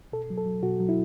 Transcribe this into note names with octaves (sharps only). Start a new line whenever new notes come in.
B2 A4
F#3
A4
F#3
B2 F#4
F#3
E4